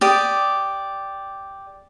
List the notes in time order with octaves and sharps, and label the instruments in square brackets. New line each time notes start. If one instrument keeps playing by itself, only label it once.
[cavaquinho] G4 D5 D#6